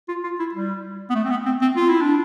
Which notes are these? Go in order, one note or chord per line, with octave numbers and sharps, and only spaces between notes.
F4
F4
E4
G3
B3
A3
C4
B3
C4
C4
F4
E4
D4